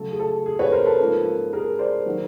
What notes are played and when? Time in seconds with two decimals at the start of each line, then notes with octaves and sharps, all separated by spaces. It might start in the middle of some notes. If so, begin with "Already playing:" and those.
Already playing: C#3 F#3 A3 A4
0.11 G#4
0.20 A4
0.46 G#4
0.59 B4 C#5
0.72 A#4 C5
0.85 A4 B4
0.99 G#2 F3 A#3 C#4
1.53 G#4 A#4
1.79 C5 D5
2.06 D#3 F#3 A#3